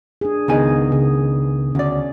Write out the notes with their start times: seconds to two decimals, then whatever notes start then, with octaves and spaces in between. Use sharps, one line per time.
0.21 D4 G#4
0.48 C#2 D#3 B3 G#4 D#5 G#5
0.92 C#3 G#4
1.75 D2 C#4 D5